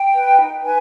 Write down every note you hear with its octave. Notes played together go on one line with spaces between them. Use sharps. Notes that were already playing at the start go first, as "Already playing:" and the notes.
Already playing: G5
B4
D#4
B4 G#5